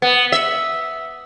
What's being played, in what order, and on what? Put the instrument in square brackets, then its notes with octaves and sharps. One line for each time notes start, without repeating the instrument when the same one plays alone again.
[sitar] B3
E5